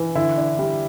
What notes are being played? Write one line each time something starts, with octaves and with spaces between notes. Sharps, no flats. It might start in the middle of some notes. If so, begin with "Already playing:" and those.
Already playing: E3
D3 E4
D4
G3